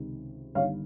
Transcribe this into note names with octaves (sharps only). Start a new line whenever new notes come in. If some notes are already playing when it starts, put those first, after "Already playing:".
Already playing: C#2 C3 D#3
G1 G2 D#3 C#5 F5